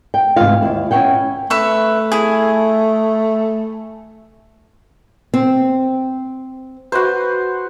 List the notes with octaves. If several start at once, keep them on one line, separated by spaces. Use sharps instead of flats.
G5
D2 G#2 C3 E3 F4 F5
D#2 E4
C#4 E4 C#5 F#5 G5
A3 B4 E5 C#6
E4 G#4
C4
F#4 B4 C5